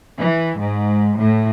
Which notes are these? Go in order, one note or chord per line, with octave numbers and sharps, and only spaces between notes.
E3
G#2
A2